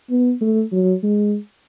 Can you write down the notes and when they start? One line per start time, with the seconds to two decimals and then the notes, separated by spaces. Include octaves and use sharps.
0.10 B3
0.41 A3
0.72 F#3
1.03 G#3